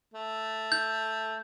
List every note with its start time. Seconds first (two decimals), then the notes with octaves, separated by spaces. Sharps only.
0.14 A3
0.72 G6